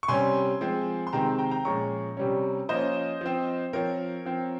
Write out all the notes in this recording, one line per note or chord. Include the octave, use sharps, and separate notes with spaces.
C#6
C3 G3 C#4 G#5 C6
F3 G#3 C4
C6
C3 D#3 G#3 C4 G5 A#5
G5 A#5
G5 A#5
A#2 F3 G#3 C#4 A#5 C#6
C3 G3 C#4
F3 A#3 C#4 C5 D#5
F3 C4
F3 C4 A#4 C#5
F3 C4